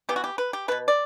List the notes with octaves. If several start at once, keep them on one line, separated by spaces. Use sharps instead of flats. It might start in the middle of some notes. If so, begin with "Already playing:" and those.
E3 B3 G4
F#4
G4
B4
G4
B2 A3 B4
D5